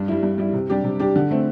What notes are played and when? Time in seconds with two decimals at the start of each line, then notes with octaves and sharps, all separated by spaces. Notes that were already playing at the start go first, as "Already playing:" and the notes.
Already playing: G2
0.08 G3 E4
0.23 G2
0.38 G3 E4
0.53 C3
0.70 G3 D4 G4
0.84 C3
1.00 G3 D4 G4
1.16 D3
1.31 A3 C4